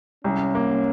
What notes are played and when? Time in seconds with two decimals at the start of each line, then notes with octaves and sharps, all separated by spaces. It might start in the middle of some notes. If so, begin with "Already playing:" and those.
0.24 C2 C#4
0.55 A#3